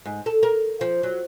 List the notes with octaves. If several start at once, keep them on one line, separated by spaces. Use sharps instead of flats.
G#2
A4
A#4
F3
F#3